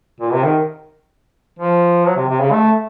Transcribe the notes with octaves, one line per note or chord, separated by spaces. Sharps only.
A#2
C3
D#3
F3
F#3
C3
C3
C#3
A3